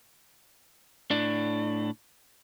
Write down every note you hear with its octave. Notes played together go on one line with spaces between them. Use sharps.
A2 D4